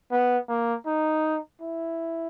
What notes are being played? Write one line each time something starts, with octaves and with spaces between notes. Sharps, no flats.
B3
A#3
D#4
E4